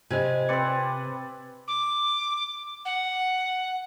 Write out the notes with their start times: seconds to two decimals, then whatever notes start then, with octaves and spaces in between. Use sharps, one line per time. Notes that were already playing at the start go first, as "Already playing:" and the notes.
0.10 C3 F4 C5 D#5 G#5
0.49 C4 B4 D5 E6 C#7
1.68 D6
2.85 F#5